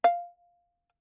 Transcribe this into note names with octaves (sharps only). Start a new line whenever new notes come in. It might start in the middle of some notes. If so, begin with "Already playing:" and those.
F5